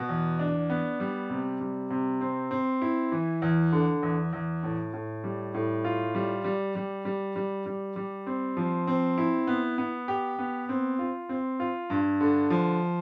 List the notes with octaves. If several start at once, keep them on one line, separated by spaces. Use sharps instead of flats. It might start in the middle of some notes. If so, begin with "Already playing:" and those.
Already playing: B2
E2
D4
B3
G3
C3
G3
C3
C4
C4
E4
E3
E2
D3
E2
E2
A2
A2
G3
A2
F4
G3
G3
G3
G3
G3
G3
G3
C4
F3
C4
E4
B3
B3
G4
B3
C4
F4
C4
F4
G2
D3
F3